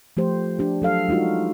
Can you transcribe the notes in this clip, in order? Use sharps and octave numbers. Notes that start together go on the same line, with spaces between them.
F3 A3 G4 C5
D4 G4
F#3 A4 F5
G#3 D#4 F4 F#4